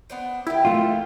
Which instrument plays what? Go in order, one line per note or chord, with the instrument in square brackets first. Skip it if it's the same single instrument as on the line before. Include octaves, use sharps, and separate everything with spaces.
[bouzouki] B3 D4 C5
[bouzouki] D#3 G4 [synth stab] E4
[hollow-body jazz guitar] A3 F4